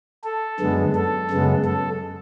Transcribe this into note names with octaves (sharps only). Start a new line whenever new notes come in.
A4
F#2 D3 G#3 B3
A4
F#2 C#3 G#3 B3
A4